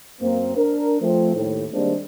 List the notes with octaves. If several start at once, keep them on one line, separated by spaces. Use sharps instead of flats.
F#2 A#3 C4
D4 A#4
F3 A3 C4
D#2 A2
D#3 G3 G#3 A#3 C4 D4